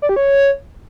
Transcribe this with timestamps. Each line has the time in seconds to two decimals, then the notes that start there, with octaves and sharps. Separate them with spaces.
0.02 D5
0.09 G4
0.16 C#5